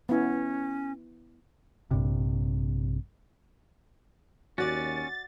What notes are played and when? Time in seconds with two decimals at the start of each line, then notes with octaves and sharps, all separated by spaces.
0.09 B3 C#4 E4
1.91 A#1 G2 C3
4.58 D#2 C#4 F#4 D5 A6